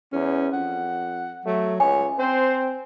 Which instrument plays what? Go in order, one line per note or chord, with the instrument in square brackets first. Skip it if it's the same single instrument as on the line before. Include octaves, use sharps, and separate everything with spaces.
[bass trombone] E2 [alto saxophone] C#4
[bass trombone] F2 [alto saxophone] F#5
[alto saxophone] F#3 [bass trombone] A3
[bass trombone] C#2 [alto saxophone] C#5 [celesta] G#5
[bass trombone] C4 [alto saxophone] C5